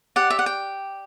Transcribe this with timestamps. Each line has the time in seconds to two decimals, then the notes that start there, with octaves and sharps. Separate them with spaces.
0.16 G4 D5 F#5
0.30 E5
0.39 F#5
0.46 G5